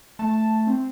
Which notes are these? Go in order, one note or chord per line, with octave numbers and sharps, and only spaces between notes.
A3 A5
C4